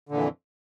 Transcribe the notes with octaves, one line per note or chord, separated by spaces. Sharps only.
F2 A#2 D3 E3